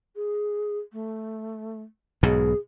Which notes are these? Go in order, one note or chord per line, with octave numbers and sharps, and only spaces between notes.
G#4
A3
B1 G#2 B2 G#4